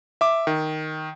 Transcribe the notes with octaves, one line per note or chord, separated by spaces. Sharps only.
E5 D6
D#3